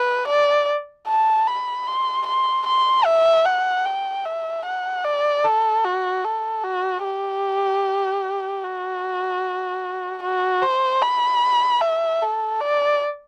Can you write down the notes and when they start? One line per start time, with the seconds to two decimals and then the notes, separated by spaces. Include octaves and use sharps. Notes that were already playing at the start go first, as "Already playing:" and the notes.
Already playing: B4
0.27 D5
1.08 A5
1.47 B5
1.87 C6
2.26 C6
2.66 C6
3.05 E5
3.45 F#5
3.85 G5
4.25 E5
4.66 F#5
5.04 D5
5.45 A4
5.85 F#4
6.24 A4
6.63 F#4
7.04 G4
8.63 F#4
10.22 F#4
10.62 C5
11.02 B5
11.81 E5
12.22 A4
12.60 D5